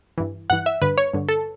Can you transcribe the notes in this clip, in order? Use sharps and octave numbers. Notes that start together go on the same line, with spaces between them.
G2 E3
G2 E3 F#5
E5
G2 D3 B4
C#5
G2 D3
A4